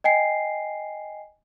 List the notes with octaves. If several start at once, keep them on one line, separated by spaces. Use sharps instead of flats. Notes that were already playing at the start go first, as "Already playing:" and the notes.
D#5 G5 G#5 C7